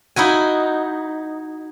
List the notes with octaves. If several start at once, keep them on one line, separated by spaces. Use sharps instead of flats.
D#4 E4 F#4 G#5